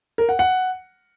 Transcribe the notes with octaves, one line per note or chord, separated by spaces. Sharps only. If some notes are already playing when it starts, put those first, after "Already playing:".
A#4
F#5
F#5